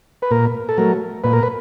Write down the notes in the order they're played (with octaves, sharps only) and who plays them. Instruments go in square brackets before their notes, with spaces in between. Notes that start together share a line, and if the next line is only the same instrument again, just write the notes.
[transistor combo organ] B4
A#2 A#4
A4
F#3 A3 A#4
A#2 B4
A#4
B4